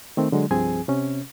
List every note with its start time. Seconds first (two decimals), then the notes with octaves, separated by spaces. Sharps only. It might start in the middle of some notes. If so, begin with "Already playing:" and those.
0.17 D#3 A3 C4
0.32 D3 F#3 G#3
0.51 C2 G2 F3 C4 G#4 G#5
0.88 C3 C#4